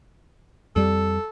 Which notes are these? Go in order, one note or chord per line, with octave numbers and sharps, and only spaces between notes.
F2 G3 A4